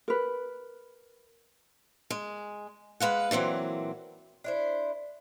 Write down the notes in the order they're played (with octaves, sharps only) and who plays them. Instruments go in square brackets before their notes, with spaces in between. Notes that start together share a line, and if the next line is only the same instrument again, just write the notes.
[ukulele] A#4 B4
[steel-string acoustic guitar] G#3
G#3 B4 F5 F#5
A#2 E3 F#3 C4
[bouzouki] D4 E4 C5